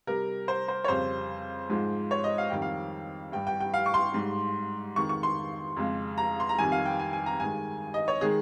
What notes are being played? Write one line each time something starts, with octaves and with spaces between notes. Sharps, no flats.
C3 G3 A#4
C5
C5
C#5
F2 C#3 G3 C5
G#2 F3 G#3
C#5
D#5
F5
F2 D#3 G3 G5
F5
G2 G3 G5
G5
G5
F5
C#6
C6
G#2 G3
F2 D#3 G#3 C#6
C#6
C6
F2 C#3 G#3
A#5
C6
A#5
F2 D#3 G3 G#5
F5
G5
G#5
G#5
A#5
G2 D#3 G#3 G#5
D#5
C#5
D#3 G#3 G#4